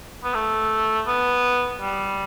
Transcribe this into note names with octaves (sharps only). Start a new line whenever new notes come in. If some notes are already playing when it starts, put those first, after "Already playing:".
B3
A3
B3
G3